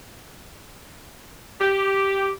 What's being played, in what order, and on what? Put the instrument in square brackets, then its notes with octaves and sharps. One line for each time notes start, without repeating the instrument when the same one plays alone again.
[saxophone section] G4